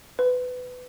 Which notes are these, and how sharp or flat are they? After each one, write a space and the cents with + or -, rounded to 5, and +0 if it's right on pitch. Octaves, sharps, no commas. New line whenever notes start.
B4 +20